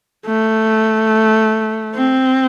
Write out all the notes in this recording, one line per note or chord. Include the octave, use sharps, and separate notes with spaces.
A3
C4